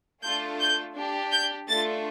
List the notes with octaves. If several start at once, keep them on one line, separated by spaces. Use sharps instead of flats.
A3 D4 F4 A4 G6
G6
D4 G4
G6
A3 D4 F4 A6